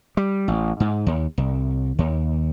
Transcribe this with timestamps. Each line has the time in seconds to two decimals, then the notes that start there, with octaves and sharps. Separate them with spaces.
0.17 G3
0.48 A1
0.80 G#2
1.07 D#2
1.38 C2
1.99 D#2